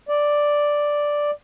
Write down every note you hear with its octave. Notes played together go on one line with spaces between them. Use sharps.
D5